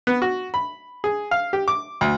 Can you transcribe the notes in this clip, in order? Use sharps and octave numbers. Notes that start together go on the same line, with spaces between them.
B3
F#4
B5
G#4
F5
G4
D6
D2